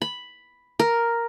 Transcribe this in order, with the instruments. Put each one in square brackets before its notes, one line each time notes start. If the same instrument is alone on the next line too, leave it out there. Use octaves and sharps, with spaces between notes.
[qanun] B5
A#4